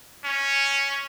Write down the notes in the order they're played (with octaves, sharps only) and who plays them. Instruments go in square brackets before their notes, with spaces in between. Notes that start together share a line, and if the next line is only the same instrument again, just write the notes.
[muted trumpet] C#4